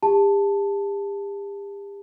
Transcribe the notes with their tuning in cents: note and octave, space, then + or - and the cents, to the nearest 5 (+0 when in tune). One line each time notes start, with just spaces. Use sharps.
G4 +40 A5 +0